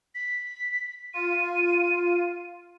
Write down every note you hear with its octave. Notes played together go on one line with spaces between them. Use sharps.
B6
F4 D#7